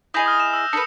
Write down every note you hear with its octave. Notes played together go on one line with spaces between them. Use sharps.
E4 G#4 D#5 D#6 G6 A#6
D#6 F6
E7
E6 A#6
D4 A4 B4 D#6 C#7